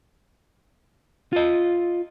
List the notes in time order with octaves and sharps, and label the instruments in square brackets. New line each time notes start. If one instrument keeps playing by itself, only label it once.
[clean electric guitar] F4 D#5